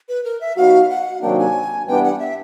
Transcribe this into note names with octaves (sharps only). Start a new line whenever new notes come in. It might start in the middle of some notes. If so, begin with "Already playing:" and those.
B4
A#4
E5
F#3 B3 D#4 F#4 F5
F#5
C3 D#3 F#3 A#3 D4 G5
G#5
G2 E3 G3 B3 D4 G5
F#5
E5